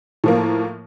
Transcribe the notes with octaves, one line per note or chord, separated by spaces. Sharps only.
A2 F3 A#3